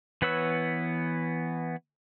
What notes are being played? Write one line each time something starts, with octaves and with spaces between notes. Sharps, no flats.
E3 B3 B4 C#5 E6